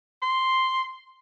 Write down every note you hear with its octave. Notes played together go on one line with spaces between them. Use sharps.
C6